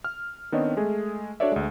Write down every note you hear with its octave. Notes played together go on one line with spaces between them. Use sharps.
F6
D#3 B3 C4 D4 C#5 D#5
G#3 A3 G#4
D4 F#4 A4 C#5 D5 E5
D2 G#3